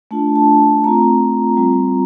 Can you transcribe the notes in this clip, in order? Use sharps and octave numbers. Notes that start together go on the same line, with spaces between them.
A3 D4 F4 A5
A5
A3 C4 F4 A#5
G3 C4 F4